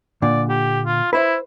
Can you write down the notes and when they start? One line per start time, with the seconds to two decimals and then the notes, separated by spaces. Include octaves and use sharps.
0.22 A#2 D3 D5
0.49 G4
0.86 F4
1.13 E4 B4 C5 E5